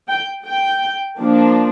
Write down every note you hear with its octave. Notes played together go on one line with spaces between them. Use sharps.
G5
G5
F3 A#3 D4